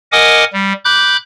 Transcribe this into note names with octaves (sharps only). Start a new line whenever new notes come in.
A#4 D#5 F#5 G#5 D6 D#6
G3
B5 D6 F#6 G6